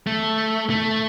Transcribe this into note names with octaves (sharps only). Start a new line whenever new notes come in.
A3
A3